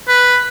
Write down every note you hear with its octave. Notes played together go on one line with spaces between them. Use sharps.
B4